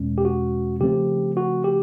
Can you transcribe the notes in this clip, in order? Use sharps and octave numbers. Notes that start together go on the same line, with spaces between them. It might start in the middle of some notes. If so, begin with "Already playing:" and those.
Already playing: E2 B2 G#3 C#4
G4
F#4
C#3 F3 A3 C4 G4
F#4
G4